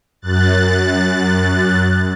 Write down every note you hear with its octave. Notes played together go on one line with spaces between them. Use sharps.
F#2 F#6 A6